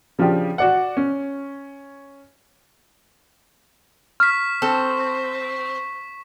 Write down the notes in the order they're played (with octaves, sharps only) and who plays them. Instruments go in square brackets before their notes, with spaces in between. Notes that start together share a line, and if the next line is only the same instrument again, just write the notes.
[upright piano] C#3 F3 D4 F4 G4
F#4 D5 F#5
C#4
[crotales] C#6 B6 [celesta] F6
[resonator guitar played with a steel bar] C4 [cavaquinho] A4